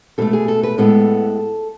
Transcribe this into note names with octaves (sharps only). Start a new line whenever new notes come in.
B2 A3 A4
G#4
A4
B4
A2 G#3 B3 A4